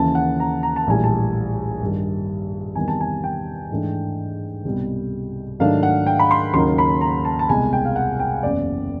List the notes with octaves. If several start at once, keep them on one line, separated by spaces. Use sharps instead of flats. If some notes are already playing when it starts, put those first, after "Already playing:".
Already playing: D#2 C#3 E3 A5
F#5
A#5
A#5
A5
A#1 A2 E3 G3 G#5
A5
G2 D#3 G3
E2 C3 D#3 G3 G#5
A5
G#5
G5
G#2 E3 A3 D4
C2 B2 G3
G#2 D#3 F#3 A3 D4 F5
F#5
G5
B5
C6
D#2 C#3 F#3 A#3 D#4 C6
B5
A#5
A5
A5
C2 B2 G#3 G#5
G5
F5
F#5
G5
F#1 E2 C#3 D5